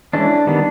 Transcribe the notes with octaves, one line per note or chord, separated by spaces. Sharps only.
E3 G#3 C#4 D4
D#3 G3 B3